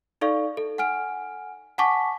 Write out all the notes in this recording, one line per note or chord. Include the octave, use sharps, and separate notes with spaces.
D#4 A4 D5 F5 C#6
A4
F#5 G#5 F6 D7
F#5 G#5 A5 C#6 D6 B6